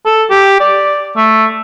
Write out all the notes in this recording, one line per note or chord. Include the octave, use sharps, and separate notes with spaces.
A4
G4
D5
A3